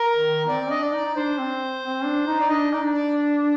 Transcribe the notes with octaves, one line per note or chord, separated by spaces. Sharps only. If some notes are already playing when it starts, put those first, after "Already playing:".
Already playing: A#4
D#3
C4 D5
D4 D#5
D5
D#4
D#4
D4 C5
C4
C4
D4
D#4
D5
D4 D#5
D#4 D5
D4
D5